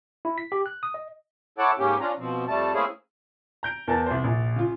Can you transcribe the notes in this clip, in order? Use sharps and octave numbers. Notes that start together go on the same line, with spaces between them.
E4
B6
G4
F#6
D#6
D#5
E4 A4 C#5 F#5 A5 D6
G#2 C#3 A#3 C#4 G4
C#4 D4 F4 A#5
B2 F3 C4
F2 G3 A3 A5
A3 A#3 C4 C#4 E4 G#4
A#5 G6 D7
E2 A#4 G#5 A5 A6
C2 C5
A#1
C#3 F4